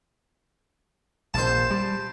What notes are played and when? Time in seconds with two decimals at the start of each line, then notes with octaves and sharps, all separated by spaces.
1.34 A#1 C5 A5
1.71 G3